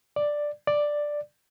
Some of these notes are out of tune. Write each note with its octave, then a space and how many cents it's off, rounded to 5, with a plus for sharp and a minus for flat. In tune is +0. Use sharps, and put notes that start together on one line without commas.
D5 +5
D5 +5